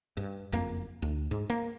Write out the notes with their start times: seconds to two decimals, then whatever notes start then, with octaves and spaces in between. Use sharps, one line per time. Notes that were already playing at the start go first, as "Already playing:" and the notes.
0.17 G2
0.52 F#1 F2 A#3
1.02 D2
1.31 G#2
1.50 A#3